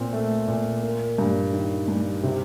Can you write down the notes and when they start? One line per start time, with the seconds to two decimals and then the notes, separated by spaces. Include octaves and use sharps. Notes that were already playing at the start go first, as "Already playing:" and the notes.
Already playing: A#2 C4
0.13 A3
0.48 A#2
0.83 A#3
1.18 G2
1.53 D#3
1.88 G2
2.23 C3